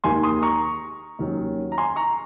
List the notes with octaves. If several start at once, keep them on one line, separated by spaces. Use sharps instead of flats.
D#2 D#3 A#3 D#4 G#5 C6
C6 D#6
A#5 C#6
D#2 D#3 F#3 C#4
A#5
G#5 C6
A#5 C#6